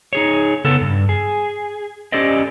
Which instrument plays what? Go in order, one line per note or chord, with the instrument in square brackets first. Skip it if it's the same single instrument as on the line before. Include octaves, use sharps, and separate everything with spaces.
[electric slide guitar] D#4 G#4 C#5
C#3 B3 A4
G2
G#4
C#4 G4 A4 C5 D5 D#5